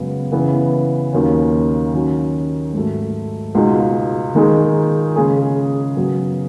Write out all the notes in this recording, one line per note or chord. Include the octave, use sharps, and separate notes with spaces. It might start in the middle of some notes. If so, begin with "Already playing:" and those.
Already playing: F#2 C#3 G#3 B3
C#3 E3 B3
D#2 D#3 F#3 C#4
D#3 F#3 C#4
G#2 F#3 A3
C#2 B2 G#3 D#4 F#4
D#3 G#3 D#4 G#4
C#3 G#3 C#4 G#4
F#2 C#3 F#3 B3